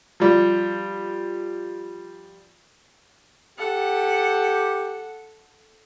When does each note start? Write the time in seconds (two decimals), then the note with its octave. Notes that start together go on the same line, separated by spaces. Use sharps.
0.20 F3 G3
3.58 G4 A4 F#5